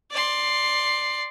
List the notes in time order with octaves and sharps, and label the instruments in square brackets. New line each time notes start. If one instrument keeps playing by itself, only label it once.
[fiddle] D5 C6